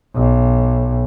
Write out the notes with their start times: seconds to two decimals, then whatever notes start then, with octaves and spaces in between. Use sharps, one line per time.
0.15 B1